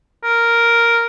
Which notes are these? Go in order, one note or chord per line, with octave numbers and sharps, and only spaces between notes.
A#4